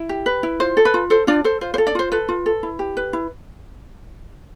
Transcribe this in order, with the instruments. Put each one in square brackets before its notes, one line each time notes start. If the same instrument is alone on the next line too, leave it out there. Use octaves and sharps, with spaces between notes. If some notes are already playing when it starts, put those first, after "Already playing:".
Already playing: [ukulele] E4
G4
B4
E4
F4 C5
A4
B4
F4
A4 C5
D4 F4 D5
A4 C5
F4 C5
C5
A4
D4 D5
F4 C5
A4 B4
F4
A4
E4
G4
B4
E4